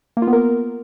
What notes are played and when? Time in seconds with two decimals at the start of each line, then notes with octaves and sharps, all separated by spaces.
0.17 A#3
0.22 F4
0.27 B3
0.33 A#4